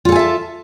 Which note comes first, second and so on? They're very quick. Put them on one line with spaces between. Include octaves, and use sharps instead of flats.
F4 A4 G#5 E5 A5